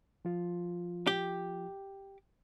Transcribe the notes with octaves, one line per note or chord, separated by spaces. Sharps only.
F3 F4
G4